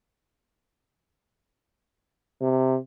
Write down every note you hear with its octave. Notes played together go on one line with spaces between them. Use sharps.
C3